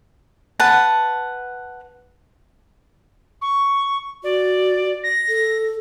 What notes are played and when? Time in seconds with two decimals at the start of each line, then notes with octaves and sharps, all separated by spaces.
0.60 B4 F#5 A5
3.42 C#6
4.24 F#4 D5
5.03 A#6
5.29 A4